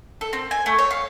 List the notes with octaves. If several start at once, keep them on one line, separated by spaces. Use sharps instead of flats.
A4
C4
G#5
A3
C#5
F5